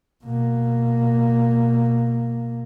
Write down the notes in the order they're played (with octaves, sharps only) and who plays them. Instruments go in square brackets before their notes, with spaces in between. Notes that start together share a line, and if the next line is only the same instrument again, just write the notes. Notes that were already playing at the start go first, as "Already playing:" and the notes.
[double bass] B2 A#3